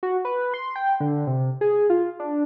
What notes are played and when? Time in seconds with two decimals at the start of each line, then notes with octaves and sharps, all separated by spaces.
0.03 F#4
0.25 B4
0.54 C6
0.76 G5
1.00 D3
1.27 C3
1.61 G#4
1.90 F4
2.20 D4